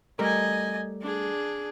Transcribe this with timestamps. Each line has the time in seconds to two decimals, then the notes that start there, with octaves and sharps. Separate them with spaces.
0.19 G3 A3 A#4 D#5 G#5
1.02 D4 G#4